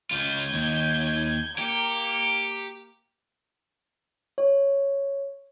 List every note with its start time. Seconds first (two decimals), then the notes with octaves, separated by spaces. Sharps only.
0.11 C#2 F4 G6 G#6
0.53 D#2
1.58 A#3 G4 C#7
4.38 C#5